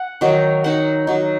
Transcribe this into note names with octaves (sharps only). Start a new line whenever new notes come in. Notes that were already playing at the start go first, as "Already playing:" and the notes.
Already playing: F#5
D#3 F#3 D#4
F#3 D#4 F#5
F#3 D#4